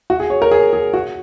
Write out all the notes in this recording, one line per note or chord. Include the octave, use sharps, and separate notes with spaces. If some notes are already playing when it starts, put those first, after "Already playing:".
F#4
G#4
C#5
A#4
G#4
G#4
F#4